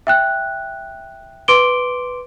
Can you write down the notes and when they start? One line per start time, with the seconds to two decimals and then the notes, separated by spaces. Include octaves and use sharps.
0.07 E5 G5 F#6
1.48 B4 C6 D6 D7 G7